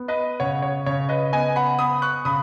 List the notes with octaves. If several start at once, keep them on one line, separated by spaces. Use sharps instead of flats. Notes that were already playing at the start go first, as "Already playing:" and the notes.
Already playing: B3
B4 D#5
C#3 C#5 F#5
C#5
C#3 C#5
B4 D#5
B3 D#5 G#5
F#5 B5
B3 B5 D#6
C#6 F#6
C#3 B5 D#6